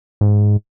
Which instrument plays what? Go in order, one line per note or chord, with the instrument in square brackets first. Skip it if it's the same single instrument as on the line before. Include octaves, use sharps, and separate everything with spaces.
[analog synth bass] G#2